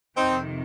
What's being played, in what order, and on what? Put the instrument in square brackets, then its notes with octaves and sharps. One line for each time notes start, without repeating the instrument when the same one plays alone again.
[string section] F2 C3 D#3 [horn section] C4 D#4